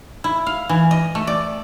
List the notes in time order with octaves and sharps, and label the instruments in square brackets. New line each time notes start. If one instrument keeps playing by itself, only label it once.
[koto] E4
F5
E3
D#5
A3
D5